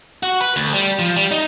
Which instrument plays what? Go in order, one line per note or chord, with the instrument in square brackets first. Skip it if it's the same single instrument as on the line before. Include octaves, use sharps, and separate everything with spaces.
[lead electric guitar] F#4
B4
D2
G3
F3
G3
D#4